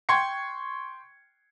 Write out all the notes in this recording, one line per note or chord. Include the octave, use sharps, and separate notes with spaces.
G5 C6 C#6 G#6 C#7